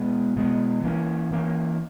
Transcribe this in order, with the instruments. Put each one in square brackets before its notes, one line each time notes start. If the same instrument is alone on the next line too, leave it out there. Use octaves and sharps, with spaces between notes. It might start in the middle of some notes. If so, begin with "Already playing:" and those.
Already playing: [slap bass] B2 G#3 B3
B2 G#3 B3
E3 A#3 C#4
E3 A#3 C#4